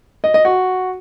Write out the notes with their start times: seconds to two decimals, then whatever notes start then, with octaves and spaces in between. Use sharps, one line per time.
0.24 D#5
0.34 D#5
0.45 F#4